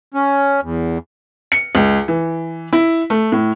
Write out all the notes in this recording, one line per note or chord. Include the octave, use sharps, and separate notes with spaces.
C#4
E2
C#7
C#2
E3
E4
A3
A2